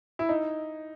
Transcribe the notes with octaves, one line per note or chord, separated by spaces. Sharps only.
E4
D#4